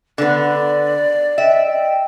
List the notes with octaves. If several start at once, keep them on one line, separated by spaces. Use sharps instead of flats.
D3 B3 D5
D#5 E5 G5